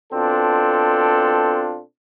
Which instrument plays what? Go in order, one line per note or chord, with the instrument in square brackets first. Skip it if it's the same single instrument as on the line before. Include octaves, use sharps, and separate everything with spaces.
[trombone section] B2 C4 D4 F4 A4